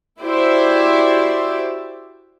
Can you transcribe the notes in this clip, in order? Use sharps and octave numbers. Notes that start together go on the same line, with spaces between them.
E4 F#4 G4 C5 D5 E5